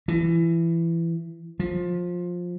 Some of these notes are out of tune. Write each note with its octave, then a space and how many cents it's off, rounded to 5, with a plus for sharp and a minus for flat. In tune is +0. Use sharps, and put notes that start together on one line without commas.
E3 +20
F3 +15